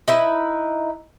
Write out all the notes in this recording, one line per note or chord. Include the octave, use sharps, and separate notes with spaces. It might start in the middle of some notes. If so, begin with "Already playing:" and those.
D#4 E4 B4